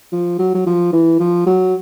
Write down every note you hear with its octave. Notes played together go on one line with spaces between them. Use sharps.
F3
F#3
F#3
F3
E3
F3
F#3